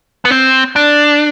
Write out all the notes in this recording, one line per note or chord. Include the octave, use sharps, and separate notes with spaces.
B3
C4
D4